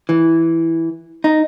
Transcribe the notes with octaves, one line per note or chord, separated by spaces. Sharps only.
E3
D#4